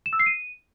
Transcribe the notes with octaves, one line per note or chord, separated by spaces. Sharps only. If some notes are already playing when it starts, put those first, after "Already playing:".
E7
E6
C7
D#7